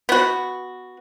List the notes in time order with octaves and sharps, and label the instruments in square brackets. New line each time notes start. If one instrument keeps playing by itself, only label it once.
[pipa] B3 F#4